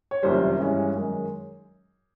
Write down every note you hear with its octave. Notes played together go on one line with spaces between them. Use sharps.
C#5
F#1 F2 C3 D#3 G3 A#4 C5
G2 E3 G#3 C#4
F#2 D#3 G#3